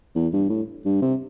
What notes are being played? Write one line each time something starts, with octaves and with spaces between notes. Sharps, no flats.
E2
G2
A2
G2
C3